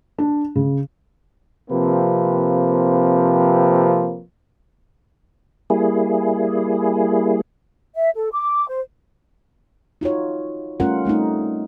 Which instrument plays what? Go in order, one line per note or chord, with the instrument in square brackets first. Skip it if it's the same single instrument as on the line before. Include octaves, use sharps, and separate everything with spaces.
[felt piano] D4
C#3
[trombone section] C3 F3 A#3 C4 B4
[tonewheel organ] G3 A#3 E4 G#4
[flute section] E5
A4
D6
C5
[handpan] D#4 F4 F#4 C#5
G3 A3 C#4 F4 A#4 F#5
G3 A3 C4 D#4